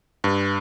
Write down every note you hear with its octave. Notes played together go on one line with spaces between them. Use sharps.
G2